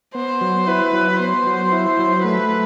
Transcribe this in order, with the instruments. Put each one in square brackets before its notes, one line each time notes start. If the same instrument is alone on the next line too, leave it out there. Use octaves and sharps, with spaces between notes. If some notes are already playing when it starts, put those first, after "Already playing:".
[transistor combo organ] B3 [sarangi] C5
[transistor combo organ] F#3
[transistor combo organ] E4 [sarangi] B4
[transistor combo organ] F#3
[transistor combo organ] B3 [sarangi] C5
[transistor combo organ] F#3
E4
F#3
[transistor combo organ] A3 [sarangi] B4